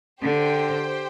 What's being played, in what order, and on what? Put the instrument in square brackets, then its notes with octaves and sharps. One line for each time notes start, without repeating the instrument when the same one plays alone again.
[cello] D3 [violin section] G4 C5 G5